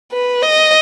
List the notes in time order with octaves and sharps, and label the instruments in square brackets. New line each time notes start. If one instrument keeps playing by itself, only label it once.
[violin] B4
D#5